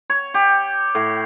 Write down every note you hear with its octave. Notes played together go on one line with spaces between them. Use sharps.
C#5
G4
A2